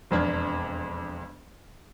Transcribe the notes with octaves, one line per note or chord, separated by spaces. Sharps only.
E1 F2 D4 F6 G#6